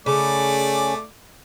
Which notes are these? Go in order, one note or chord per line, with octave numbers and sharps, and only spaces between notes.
C#3 A3 C#4 D5 D6